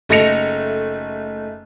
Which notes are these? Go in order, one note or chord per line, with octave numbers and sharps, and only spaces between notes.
F#1 A3 D#4 A#6 C#7 F7